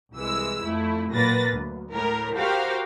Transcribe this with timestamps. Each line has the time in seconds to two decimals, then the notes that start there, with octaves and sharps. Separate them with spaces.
0.16 C2 E3 G#3 E6
0.62 F2 A3 E4
1.12 A#2 F#3 A#3 B4 A6 A#6
1.53 D2
1.92 A2 A#4
2.37 F#4 G4 A#4 C5 F5 G5